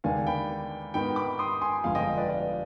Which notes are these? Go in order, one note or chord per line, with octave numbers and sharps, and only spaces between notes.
D#2 D3 G#3 D4 F5 G#5
G5 B5
G#2 D#3 B3 G5 B5
B5 D6
C6 D#6
G#5 C6
G1 F2 D3 F3 G#3 F5 G#5
D#5 G5
B4 D5
D5 F5